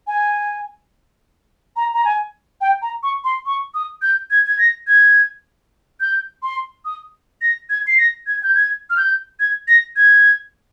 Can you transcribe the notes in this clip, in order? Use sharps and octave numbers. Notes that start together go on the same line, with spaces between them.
G#5
A#5
A#5
G#5
G5
A#5
C#6
C6
C#6
D#6
G6
G#6
G#6
A#6
G#6
G6
C6
D#6
A#6
G#6
C7
A#6
G#6
G6
G#6
F6
G6
G#6
A#6
G#6